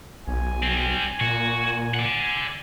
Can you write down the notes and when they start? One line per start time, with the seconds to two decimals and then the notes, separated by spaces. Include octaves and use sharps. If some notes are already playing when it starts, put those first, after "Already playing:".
0.27 B1 G#5
0.63 G3 C4
1.21 A#2 F#4
1.94 D5 F#5